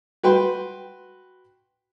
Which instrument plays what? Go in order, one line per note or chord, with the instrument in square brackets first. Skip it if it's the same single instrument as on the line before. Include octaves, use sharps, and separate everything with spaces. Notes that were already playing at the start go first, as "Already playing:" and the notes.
[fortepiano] F#4 B4 G5 C6